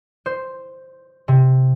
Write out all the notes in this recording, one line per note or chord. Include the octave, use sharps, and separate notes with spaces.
C5
C3